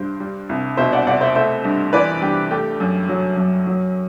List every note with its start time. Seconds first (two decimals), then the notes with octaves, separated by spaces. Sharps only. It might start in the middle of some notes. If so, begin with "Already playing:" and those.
Already playing: G2 C5
0.20 G3
0.49 C2
0.77 B2 C5 E5
0.92 D5 F#5
1.07 C2 D5 F#5
1.21 C5 E5
1.35 A3 C5 E5
1.64 G2
1.93 E3 B4 D5
2.21 G2 G4
2.51 A3 G4
2.80 F#2
3.09 F#3
3.37 F#2
3.67 F#3